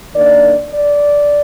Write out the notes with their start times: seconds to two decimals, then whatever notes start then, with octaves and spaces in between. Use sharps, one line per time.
0.15 D#3 A#3 D4 D5
0.70 D5